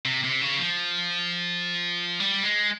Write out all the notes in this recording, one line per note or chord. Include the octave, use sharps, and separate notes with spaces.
C3
C3
C#3
F3
G3
G#3